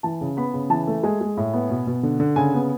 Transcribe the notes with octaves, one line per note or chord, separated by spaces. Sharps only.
E3 A5
C#3
B3 B5
C#3
E3 A5
A3
G#3 G#5
G#3
A2
B3
B2
B2
D3
D3
C#3 G#5
B3